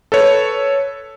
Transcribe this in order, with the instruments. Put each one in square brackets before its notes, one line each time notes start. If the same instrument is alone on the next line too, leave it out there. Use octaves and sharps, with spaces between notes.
[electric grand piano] A4 B4 C#5